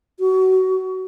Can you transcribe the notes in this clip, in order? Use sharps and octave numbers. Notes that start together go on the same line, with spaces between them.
F#4